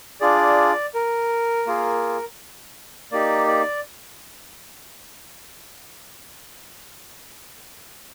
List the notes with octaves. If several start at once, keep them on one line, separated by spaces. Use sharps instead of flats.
D4 F4 G#4 D5
A#4
A#3 F4 G#4
A#3 D#4 G4 D5
D5